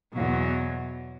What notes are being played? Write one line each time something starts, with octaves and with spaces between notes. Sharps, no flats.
E2 B2 F#3